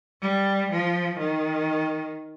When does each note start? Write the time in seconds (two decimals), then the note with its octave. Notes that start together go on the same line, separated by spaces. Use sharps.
0.21 G3
0.71 F3
1.19 D#3